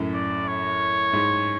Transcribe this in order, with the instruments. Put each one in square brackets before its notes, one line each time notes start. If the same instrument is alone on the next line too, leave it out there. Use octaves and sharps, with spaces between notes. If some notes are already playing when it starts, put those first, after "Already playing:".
Already playing: [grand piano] F#2 A2
[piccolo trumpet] D5
C#5
[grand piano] G#2